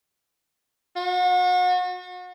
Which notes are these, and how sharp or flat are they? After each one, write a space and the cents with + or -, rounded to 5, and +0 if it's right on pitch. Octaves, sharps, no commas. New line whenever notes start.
F#4 -35